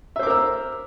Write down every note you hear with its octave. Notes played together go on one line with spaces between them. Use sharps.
A#4 C5 E5 D6 E6